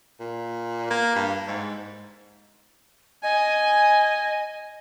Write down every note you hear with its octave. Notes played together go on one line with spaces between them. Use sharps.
A#2
A#3
G2
G#2
D#5 G#5